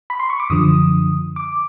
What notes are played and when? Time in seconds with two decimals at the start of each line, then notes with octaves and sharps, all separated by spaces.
0.10 B5
0.20 C6
0.30 C#6
0.40 D6
0.50 F#2 D3 F3 D#6
1.36 D6